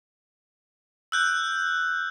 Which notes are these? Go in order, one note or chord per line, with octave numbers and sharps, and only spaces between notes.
E6 F#6 G6